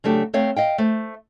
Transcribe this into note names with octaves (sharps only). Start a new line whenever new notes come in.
C#3 F#3 A3 D4 G4
A3 C4 C#5 F5
D#5 F5 G5
A3 C5